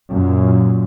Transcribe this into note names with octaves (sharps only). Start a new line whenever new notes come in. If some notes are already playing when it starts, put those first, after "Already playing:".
F#2 A#2